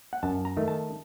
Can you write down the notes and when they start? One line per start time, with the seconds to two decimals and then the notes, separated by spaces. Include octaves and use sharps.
0.13 F#5
0.23 F#2 A5
0.45 A#5
0.57 D#3 A3
0.68 A5